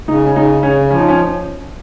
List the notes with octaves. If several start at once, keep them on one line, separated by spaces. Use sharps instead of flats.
C#3 D#4
C#4
C#3 D#4
C#3 C#4
F3 C#4
D#4
C#4